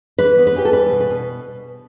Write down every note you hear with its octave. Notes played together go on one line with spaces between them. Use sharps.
E3 B4
B3
B4
E3 G4
A4
G3 B4
B4
B2
B4
B2